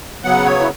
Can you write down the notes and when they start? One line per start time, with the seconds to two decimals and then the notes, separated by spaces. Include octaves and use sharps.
0.24 C#3 F#3 B3 F#5
0.45 C#5
0.60 E4